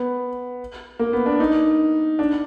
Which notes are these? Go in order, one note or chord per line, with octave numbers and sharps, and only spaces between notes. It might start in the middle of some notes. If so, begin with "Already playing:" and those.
Already playing: B3
A#3
B3
D4
D#4
D4